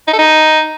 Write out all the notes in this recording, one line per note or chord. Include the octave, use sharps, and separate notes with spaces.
D#4
A4
D#4